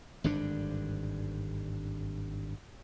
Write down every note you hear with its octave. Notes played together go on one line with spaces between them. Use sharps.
G#1 G2 D3 D4